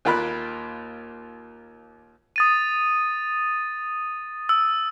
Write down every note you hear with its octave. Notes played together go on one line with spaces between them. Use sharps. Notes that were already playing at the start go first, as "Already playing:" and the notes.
D#2 A#3 F4 A#4 B5 F#6
D#6 A6 D#7
E6